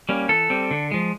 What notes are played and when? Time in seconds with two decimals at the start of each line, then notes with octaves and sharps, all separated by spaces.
0.09 G3 A#3 C#4
0.29 E3 A4
0.50 G3 C4
0.71 D3
0.92 F3 G#3